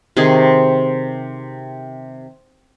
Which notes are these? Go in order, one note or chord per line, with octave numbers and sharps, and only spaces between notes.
C3 D#3 G#4 C6